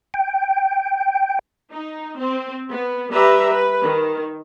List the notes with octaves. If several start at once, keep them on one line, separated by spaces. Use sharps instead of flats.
G5
D#4
C4
B3
G3 G4 B4 E5 A#5
B4
D#3